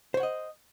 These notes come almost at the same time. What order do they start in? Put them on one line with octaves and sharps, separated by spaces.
C5 C#5 F#5 D#5